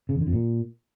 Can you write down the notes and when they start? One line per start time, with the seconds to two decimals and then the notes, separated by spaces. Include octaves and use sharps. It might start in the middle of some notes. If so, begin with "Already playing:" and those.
0.09 C#3
0.15 E2
0.21 D3
0.27 F2
0.33 A#2